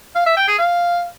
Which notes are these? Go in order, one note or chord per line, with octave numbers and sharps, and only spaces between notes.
F5
E5
G5
G#4
F5